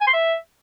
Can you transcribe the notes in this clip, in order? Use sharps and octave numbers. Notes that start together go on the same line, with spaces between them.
G#5
C6
E5